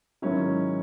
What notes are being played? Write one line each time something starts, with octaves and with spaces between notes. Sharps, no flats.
G#2 D#3 F#3 C#4 E4